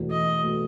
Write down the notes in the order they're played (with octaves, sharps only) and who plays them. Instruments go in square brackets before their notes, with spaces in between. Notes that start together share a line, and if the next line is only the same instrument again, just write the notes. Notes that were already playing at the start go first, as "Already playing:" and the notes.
Already playing: [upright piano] E2 B2 A3
[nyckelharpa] D#5
[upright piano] B2 A3